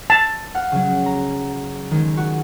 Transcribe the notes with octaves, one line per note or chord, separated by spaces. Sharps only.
A5
F5 F#5
C#3 F#3
A#5
D#3 G#3
F#4